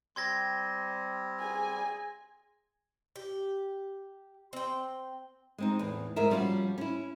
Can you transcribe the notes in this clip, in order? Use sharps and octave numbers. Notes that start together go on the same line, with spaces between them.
G3 C4 C6 G#6 A#6
G#4 G#5
G4
C4 G5
G#3 C4 D#4
E2 A2
D2 G#2 G#4 A#4 E5
F3 G3 C#4 D#4 F4 F#4
C#4 E4